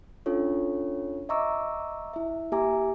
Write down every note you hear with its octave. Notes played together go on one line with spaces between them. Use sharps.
C#4 D4 F4 A4 C#5
D#5 E5 A#5 C#6 D6 E6
E4 E5
A#3 G4 E5 G#5 A#5 D6